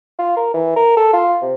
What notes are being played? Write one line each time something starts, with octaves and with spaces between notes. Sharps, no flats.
F4
A#4
E3
A#4
A4
F4
C3